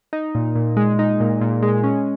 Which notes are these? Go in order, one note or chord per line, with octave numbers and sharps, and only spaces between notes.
D#4
A#2
A#2
G#3
D#4
A#2
A#2
G#3
C#4